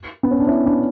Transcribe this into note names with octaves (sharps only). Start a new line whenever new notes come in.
B3
C#4
D4
C#4 E4
B3 D4